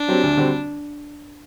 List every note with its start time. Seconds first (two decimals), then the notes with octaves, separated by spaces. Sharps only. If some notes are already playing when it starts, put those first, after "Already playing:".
Already playing: D4
0.08 F#3 C4 G4
0.23 D2
0.37 D3 G3 C4 F#4